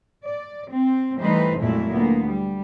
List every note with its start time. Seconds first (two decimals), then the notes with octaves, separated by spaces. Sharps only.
0.25 D5
0.70 C4
1.19 E3 G3 A3 D#4 B4 C5
1.59 F2 A#2 F#3 G#3 A3 E4
1.93 D2 A#3 B3
2.27 G3